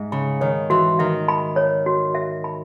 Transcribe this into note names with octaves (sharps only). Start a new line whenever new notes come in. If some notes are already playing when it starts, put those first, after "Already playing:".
Already playing: G#2 E5
C#3 B5
D#3 C#5
E3 F#4
D#3 E5
B5
C#5
F#4
E5
B5